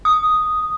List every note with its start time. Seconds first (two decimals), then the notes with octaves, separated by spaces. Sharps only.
0.05 D#6